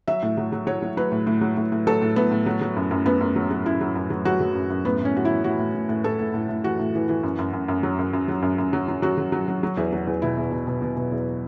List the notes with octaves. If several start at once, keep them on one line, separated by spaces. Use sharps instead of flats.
F#3 E5
A2
F#3
F#3
F#3 C#5
F#3
F#3 B4
A2
A2
F#3
A2
A2
F#3 A4
A2
A2 B3
A2
F#3
F#3
F#2
F#2
F#2 B3
F#2
F#3
F#3
F#2 E4
F#3
F#2
F#3
F#3 F#4
F#3
F#2
F#2
A2 B3
A2 C#4
A2 F#4
E3 E4
A2 F#4
A2
A2
A2
A2 A4
A2
A2
A2
E3 F#4
A2
E3
E3
F#2
F#2
F#2
F#2
F#3
F#2
F#2
F#3
F#2
F#2
F#3
F#3
F#3 F#4
F#3
F#3
F#3
F#3
E2
F#3
E2
B2 E4
E2
B2
B2
B2
B2
E2